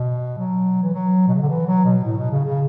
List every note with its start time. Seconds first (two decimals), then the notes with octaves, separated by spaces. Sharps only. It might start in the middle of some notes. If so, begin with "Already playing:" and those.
Already playing: B2
0.38 F#3
0.83 E3
0.94 F#3
1.27 B2
1.34 C#3
1.41 D3
1.49 E3
1.67 F#3
1.85 B2
2.04 A2
2.17 B2
2.31 C#3
2.45 C#3